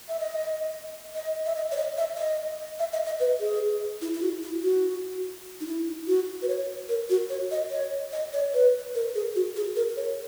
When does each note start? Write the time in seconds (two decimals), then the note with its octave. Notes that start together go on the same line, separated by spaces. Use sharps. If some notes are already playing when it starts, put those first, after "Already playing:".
0.09 E5
0.20 D#5
1.15 D#5
1.46 E5
1.55 D#5
1.72 C#5
1.77 D#5
1.97 E5
2.17 D#5
2.79 E5
2.93 D#5
3.06 D#5
3.20 B4
3.40 G#4
4.02 E4
4.14 E4
4.22 F#4
4.43 E4
4.63 F#4
5.61 D#4
5.66 E4
6.07 F#4
6.42 B4
6.48 C#5
6.89 A#4
7.10 F#4
7.30 C#5
7.51 D#5
7.71 C#5
8.13 D#5
8.33 C#5
8.54 B4
8.95 A#4
9.15 G#4
9.36 F#4
9.56 G#4
9.76 A#4
9.97 C#5